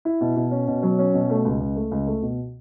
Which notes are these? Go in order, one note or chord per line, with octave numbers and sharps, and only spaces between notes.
E4
B2
B2
C#4
B2
F#3
C#4
B2
A3
C#2
C#2
A3
C#2
A3
B2